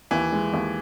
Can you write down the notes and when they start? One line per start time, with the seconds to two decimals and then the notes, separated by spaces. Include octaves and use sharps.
0.11 D#2 E3
0.32 G#3
0.53 D#2